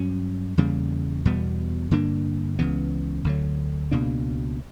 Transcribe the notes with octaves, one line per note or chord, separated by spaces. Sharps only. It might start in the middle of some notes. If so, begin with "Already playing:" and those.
Already playing: G2 F#3 C#4
E2 C#3 G3 A#3
E2 B2 G3 B3
G2 D3 A#3 D4
C#2 C#3 E3 B3
D2 D3 F#3
C#2 B2 A#3 D4